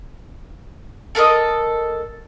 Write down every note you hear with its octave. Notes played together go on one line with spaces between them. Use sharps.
A4 A#4 C5 D#5